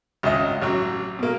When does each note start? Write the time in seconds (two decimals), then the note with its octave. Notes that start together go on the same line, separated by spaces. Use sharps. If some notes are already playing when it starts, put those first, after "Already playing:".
0.23 G#1 C#2 D#5
0.62 A1 F#3
1.19 B2 A#3